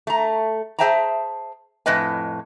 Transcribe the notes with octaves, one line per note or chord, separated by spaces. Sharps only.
A3 A#5
G#4 C5 E5 G5 A5 A#5
F2 A2 E4 B4 D#5 G#5